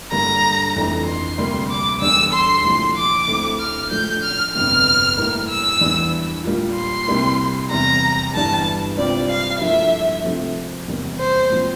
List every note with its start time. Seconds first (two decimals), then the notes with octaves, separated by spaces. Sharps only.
0.11 G2 D3 G3 A#3 A#5
0.75 F1 F2 E3 A3 D4
1.06 C6
1.38 D2 C3 G3 A#3
1.70 D6
2.01 E2 D3 G3 D4 E6
2.33 C6
2.64 C2 A#2 F3 A3 E4
2.96 D6
3.27 D2 D3 A3 C4 E4
3.59 F6
3.91 A2 F3 A3 D4 G6
4.23 F6
4.54 G1 F2 C3 F6
5.17 A2 G3 A#3 E4 A#4
5.49 E6
5.81 E2 E3 G3 D4
6.44 A#2 G3 A#3 F4
6.76 C6
7.07 C2 C3 G3 A#3 E4
7.71 E2 C3 G3 A#5
8.34 G1 G2 E3 G3 D4 A5
8.97 C2 C3 G3 C4 F4 D5
9.29 F5
9.60 G2 F3 A#3 E4 A4 E5
10.24 C3 F3 A3 C4
10.88 E2 C3 G3 A#3
11.19 C5
11.50 A#2 F3 C4